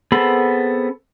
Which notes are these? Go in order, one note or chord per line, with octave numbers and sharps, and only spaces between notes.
B3 C4 G#4 A4 B5